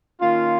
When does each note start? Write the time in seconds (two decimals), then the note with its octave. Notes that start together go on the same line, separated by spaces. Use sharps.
0.21 D#3 A#3 C#4 F4